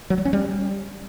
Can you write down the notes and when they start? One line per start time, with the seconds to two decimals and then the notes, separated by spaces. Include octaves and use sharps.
0.10 F#3
0.18 G3
0.25 C#4
0.33 G3